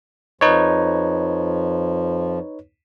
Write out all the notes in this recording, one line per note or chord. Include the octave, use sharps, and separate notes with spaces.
F2 F3 D#4 B4 C#5